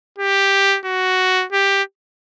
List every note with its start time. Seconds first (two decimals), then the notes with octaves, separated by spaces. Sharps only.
0.18 G4
0.85 F#4
1.52 G4